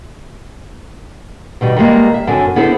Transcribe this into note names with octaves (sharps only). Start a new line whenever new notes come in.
B2 D#3 G3
D#3 G3 G#3 A#3
E5
F#2 D3 C4 G#5
D3 B3 E4 G#4 A4 C5